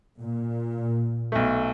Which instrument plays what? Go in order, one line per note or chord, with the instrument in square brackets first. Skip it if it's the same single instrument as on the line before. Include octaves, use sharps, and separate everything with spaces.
[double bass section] A#2
[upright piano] B1 A3